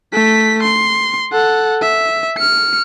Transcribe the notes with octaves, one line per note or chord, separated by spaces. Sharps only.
A3 B6
C6
A4 F#5
E5
F6 C#7